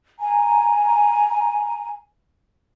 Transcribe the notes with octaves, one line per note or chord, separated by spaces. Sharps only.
G#5 A#5